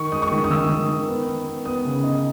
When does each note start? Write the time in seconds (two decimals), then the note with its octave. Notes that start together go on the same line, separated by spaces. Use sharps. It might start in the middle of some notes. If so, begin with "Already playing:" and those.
Already playing: D#3 C#6
0.12 G#3 D#6
0.22 C#6
0.32 D#3
0.44 D#6
0.50 D#3 E6
0.69 D#3
0.89 D#3
1.08 B3
1.27 B3
1.47 B3
1.65 B3 D#6
1.85 C#3
2.03 D#4